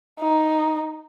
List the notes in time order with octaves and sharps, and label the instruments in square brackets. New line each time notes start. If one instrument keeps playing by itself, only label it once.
[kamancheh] D#4